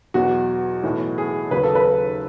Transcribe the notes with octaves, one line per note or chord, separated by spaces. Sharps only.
E2 B2 F#3 F#4
B1 A2 E3
G#4
D#2 C#3 F#3 B4
A4
B4